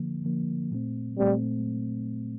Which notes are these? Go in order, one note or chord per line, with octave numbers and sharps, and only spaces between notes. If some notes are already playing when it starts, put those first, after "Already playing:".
Already playing: D3 F3 A#3
D3 F3 A#3
A#2 A3 C4
A#2 G3 A3 C4